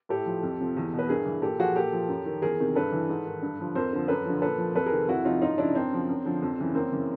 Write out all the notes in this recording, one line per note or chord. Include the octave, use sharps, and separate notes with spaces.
A2 G4 A4
F3
F2
C3 F3
E2
B2
B4
G2 G#4 A#4
E3
A#2 G4 A4
F3 F#4 G#4
A#2 G4 A4
F3
F#2
D#3
E2 G#4 A#4
C3 D#3
G2 A4 B4
E3
G#2
D#3
G2
D3 F3
F2 A#4 C5
D3 F3
F#2 A4 B4
D3 F3
A#2 A4 B4
F3
F2 A4 B4
G#4 A#4
C3 D#3
F2 E4 F#4
C3 F3 D#4 F4
F#2 D#4 F4
C#3 F3 D4 E4
F#2 C4 D4
C#3 F3
F#2
D3 F3
F2
C#3 E3
F#2 A#3 C4
C#3 E3